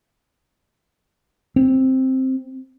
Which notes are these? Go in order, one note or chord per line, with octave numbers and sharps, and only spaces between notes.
C4